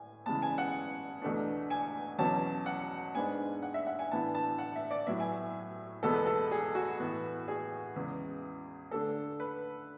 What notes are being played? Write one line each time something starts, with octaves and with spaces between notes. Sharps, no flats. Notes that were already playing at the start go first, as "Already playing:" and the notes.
Already playing: A2 G#5
C#3 E3 G#3 B3 A5
G#5
F#5
E2 B2 A3 D4
G#5
E2 B2 F#3 C#4 A5
F#5
G#2 G#3 B3 D4 G#5
F#5
E5
F#5
G#5
A2 E3 B3 D4 A5
A5
F#5
E5
D5
A2 F#3 B3 E5
G#5
E2 B2 G#3 B3 A4
B4
A4
G#4
F#4
A2 E3 B3
G#4
E2 C#3 G#3
D3 A3 D4 A4
B4